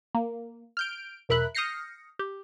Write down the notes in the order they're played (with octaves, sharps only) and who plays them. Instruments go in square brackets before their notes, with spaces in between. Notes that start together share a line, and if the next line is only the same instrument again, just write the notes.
[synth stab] A#3
F6 G6 D7
B1 E2 A#4 E5 B5 F#6
D#6 F6 G6 A#6 C7 C#7
G4